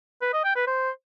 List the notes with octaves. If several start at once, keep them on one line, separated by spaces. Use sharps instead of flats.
B4
D#5
G5
B4
C5